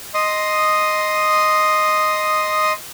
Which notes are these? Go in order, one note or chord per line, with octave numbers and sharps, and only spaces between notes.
D#5 C6 D#6